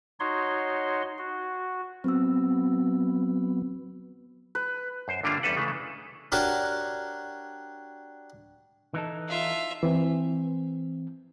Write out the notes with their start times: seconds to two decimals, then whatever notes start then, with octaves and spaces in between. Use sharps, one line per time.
0.20 D#4 F#4 C#5 C6
1.18 F#4
2.04 F#3 B3 C4 F#4 E6
4.55 B4
5.08 F#2 C5
5.23 G2 D3 G3 A#3 D4 F4
5.43 E2 G3 C#4 A4 B4 F#5
5.56 C#3 E3 G#3 A3
6.32 D4 F#4 G4 A#4 C#5 D5
8.94 E3 D#4 A4
9.28 F4 E5
9.83 E3 C4